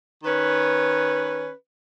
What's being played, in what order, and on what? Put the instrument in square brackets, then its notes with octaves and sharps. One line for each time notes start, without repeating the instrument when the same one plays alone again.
[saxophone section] D#3 C#4 B4